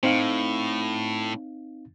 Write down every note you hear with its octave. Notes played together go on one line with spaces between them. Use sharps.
A2 C4 D#4 F5